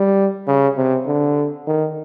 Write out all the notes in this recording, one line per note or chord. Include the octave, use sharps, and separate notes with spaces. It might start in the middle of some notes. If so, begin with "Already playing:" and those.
Already playing: G3
C#3
C3
D3
D#3